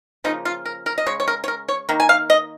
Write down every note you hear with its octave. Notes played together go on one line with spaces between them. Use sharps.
C#3 F3 A#3 D#4
F4
A#4
A#4
D#5
C#3 G#3 C#5
C#5
A#4
C#5
A#4
C#5
D#3 A#3
G#5
F5
D#5